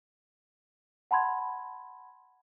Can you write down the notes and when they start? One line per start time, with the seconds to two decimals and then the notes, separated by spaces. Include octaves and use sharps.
1.11 F#5 A5 B5 C6 G#6